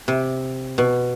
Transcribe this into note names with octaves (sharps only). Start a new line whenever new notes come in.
C3
B2